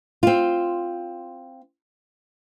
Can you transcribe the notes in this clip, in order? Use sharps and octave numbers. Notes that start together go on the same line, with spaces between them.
C4 F4